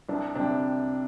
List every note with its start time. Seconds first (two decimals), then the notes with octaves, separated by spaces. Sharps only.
0.09 C2 D4
0.35 C3 G3 D4